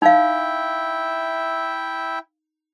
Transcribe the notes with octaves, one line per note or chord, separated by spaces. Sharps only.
D#4 E4 E5 F5 G5